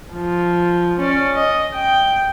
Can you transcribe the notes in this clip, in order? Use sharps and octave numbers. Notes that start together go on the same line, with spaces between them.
F3
C#4 D5
D#5
G5